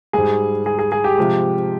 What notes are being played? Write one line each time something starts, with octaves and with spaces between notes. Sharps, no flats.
G#2 G3 G#4
G#4
G#4
G#4
G4
C3 F3 G#3